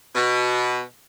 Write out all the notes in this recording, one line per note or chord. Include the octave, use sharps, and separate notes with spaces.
B2